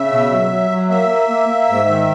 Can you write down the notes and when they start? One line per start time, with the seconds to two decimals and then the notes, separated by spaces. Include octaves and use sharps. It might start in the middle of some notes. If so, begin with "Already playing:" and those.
Already playing: C#3 E5
0.12 B2
0.31 F#3
0.51 F#3
0.71 F#3
0.90 A#3 E5
1.09 A#3
1.29 A#3
1.49 A#3
1.69 G#2
1.88 D#3